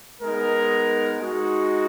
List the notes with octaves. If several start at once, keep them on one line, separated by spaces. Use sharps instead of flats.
G#3 B3 D#4 A#4
G#3 D#4 F#4